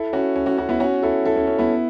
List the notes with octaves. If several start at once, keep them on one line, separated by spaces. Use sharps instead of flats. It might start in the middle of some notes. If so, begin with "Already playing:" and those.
Already playing: E4 A4
C#4 F#4
C#4
C#4 F#4
C#4 F#4
B3 E4
C#4 F#4
E4 A4
E4 A4
C#4
C#4
B3 E4